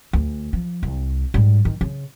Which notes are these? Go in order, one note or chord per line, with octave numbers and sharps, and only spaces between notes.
D2
F3
C2
G#2 G3
D#3
C#3